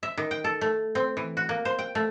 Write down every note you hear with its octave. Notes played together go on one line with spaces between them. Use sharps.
E5
D#3
G5
A4
A3
C4
E3
F#4
A#3
C5
G5
A3